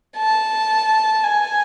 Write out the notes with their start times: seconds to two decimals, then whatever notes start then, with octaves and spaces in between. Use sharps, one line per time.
0.17 A5
1.24 G#5